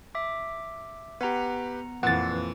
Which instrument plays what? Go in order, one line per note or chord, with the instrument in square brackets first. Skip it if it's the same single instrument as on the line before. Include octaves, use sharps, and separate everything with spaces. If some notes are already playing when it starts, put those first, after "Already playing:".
[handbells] E5 D6
[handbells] B3 F#5 A#5 [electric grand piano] G4 B4
[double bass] F2 E3 [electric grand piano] A#2 [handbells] B4 [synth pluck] F#5 A6